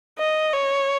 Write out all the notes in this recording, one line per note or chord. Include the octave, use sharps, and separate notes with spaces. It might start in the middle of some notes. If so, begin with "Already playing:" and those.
D#5
C#5